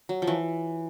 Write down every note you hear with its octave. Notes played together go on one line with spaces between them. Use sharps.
F#3
F3
E3